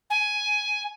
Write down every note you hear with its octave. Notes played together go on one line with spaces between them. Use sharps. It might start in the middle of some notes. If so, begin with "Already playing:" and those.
G#5